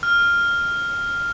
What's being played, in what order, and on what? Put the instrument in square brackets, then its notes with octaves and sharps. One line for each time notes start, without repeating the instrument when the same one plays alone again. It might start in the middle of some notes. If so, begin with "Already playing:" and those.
[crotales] F6